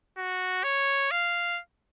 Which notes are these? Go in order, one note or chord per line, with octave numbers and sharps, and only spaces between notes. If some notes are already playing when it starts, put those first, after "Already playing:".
F#4
C#5
F5